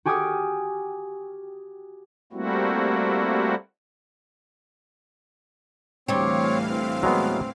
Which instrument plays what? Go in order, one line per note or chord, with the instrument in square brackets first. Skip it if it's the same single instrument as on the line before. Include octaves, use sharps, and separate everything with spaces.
[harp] F#4 G4 G#5 D6 D#6 F6
[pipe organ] G3 A3 A#3 C4 E4 F#4
[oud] D2 G3 G4 [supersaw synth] A2 E3 F5 [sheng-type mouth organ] C4 C#5
[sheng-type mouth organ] C4
[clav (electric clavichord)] F#3 G#3 B3